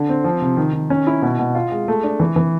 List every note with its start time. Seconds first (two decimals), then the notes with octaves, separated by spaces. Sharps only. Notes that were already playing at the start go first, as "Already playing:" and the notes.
Already playing: D3
0.09 C4
0.24 F3
0.42 C3
0.57 D#3
0.73 D#3
0.90 C#4
1.07 E4
1.22 B2
1.39 B2
1.55 F4
1.72 G#3
1.88 A3
2.03 D4
2.20 E3
2.36 E3